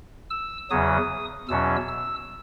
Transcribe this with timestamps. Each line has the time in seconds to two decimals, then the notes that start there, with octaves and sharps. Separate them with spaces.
0.30 E6
0.70 E2 C#3 F#3 D#6
1.49 E2 B2 F#3 C#4 E6
1.88 E6